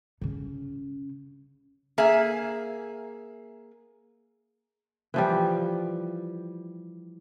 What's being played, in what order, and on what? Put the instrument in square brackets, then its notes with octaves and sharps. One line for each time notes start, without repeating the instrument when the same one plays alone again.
[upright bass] C#3 C#4
[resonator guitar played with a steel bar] A#3 G#4 E5
[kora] E3 F3 G3